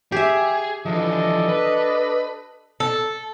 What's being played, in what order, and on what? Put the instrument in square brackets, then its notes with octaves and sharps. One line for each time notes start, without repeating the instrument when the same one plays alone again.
[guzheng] G4 E5 [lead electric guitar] G#4
[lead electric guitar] E3 F3 [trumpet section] D4 A4 D#5
[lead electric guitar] B4
[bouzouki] A4